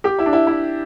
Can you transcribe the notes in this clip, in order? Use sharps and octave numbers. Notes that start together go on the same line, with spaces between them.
G4
E4
D4
E4
E4